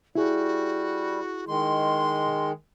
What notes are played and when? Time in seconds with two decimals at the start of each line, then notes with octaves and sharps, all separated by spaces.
0.15 G3 E4 F#4 G#4
1.47 D#3 G#3 C6